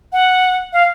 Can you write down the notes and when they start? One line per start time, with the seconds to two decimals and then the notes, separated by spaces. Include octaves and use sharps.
0.13 F#5
0.73 F5